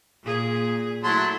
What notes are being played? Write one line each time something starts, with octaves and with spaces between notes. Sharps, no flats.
A#2 G#4
F#3 A3 E4 A5 C6